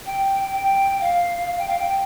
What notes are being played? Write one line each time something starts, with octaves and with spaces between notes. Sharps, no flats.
G5
G5
F5
G5
F5
G5